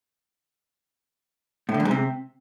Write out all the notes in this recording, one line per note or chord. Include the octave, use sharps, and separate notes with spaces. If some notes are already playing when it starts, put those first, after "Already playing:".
A2
D3
F#2
G#2
C3